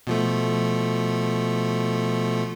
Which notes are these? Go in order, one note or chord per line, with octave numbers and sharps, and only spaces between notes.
B2 F3 A3